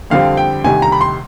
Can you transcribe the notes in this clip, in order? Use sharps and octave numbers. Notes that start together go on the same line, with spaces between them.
F2 D3 G3 C4 F5
G5
D2 C3 D#3 G3 G#5
A#5
B5
C6